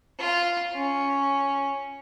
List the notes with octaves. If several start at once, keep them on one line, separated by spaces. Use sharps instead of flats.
F4
C#4